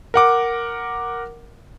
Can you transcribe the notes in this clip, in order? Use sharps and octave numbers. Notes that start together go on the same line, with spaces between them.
A#4 F#5 D6